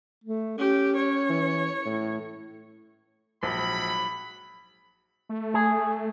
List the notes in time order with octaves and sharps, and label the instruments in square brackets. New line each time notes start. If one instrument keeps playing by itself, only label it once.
[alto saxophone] A3
[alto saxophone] C#4 [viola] G4
[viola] C#5
[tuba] E3
A2
[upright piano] A#1 [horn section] G#2 F#3 B5
[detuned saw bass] A3
[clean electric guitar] G#4